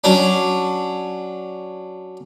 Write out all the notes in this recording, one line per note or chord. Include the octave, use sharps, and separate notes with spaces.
F#3 C#4 D4